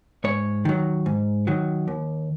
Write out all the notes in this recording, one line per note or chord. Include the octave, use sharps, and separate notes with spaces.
G#2 C#5
D#3 F#3
G#2
D#3 F#3
D#2